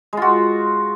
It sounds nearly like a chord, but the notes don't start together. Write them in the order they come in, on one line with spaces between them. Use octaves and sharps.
G#3 F4 F#4